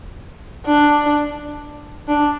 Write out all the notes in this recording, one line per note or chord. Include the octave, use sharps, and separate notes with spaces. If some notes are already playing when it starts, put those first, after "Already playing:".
D4
D4